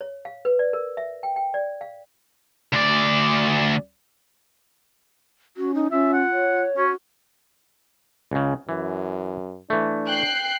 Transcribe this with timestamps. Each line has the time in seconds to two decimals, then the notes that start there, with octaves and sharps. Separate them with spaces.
0.01 C#5
0.25 F5
0.45 B4
0.59 D5
0.73 A#4
0.97 E5
1.23 G5
1.36 G5
1.54 D5
1.81 F5
2.73 D2 D5
5.57 C#4 F#4
5.74 D#4
5.91 C#4 F4 E5
6.13 F#5
6.32 C#5
6.77 C#4 F#4
8.31 C#2 C#3
8.69 F#2 E3
9.70 E3 A3 D4
10.08 G5 F#6 C7